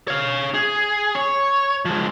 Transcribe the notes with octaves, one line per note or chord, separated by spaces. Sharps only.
C#5 F5
G#4
C#5
F3 G#3